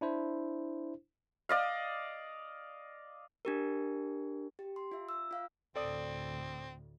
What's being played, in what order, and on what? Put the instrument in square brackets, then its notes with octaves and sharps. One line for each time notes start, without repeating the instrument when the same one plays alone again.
[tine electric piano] D4 E4 C5
[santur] D5 D#5 F5
[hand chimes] D4 G4 A#4
G4
C6
F4 E5
E6
F4 F5
[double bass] D2 A2 [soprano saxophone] C4 [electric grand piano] A4 D5 D#6